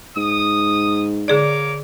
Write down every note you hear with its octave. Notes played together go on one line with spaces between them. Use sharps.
G#2 D#6
D3 A#3 G#4 C#5 D5 D6